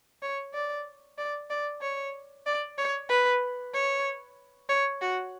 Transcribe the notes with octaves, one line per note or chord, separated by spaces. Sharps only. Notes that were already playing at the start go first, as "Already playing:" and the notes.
C#5
D5
D5
D5
C#5
D5
C#5
B4
C#5
C#5
F#4